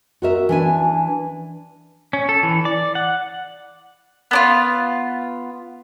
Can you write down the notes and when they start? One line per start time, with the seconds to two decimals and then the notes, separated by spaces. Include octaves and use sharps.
0.22 F#4 A#4 E5
0.49 E3 D4 G#5
2.13 C#4
2.29 A4
2.43 E3
2.65 D5
2.95 F#5
4.31 B3 D4 F4